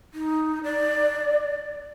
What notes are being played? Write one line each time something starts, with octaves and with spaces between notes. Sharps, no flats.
D#4
D5